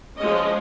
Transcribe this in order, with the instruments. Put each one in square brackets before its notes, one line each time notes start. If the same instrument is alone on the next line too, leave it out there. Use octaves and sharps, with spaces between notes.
[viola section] F3 G#3 C#4 D#5